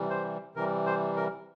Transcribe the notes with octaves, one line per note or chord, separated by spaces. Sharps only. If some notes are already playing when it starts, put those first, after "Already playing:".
Already playing: C3 E3 G3
C5
C3 E3 G3 A#4
C5
A#4